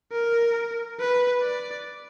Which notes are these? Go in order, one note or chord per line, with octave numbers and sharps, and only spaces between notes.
A#4
B4
D5